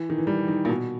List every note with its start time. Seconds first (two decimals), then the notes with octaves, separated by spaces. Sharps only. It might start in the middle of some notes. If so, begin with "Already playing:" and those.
Already playing: E3
0.10 D#3
0.18 E3
0.27 G3
0.48 D#3
0.65 A#2
0.69 B2